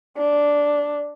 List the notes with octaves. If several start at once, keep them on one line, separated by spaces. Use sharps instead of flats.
D4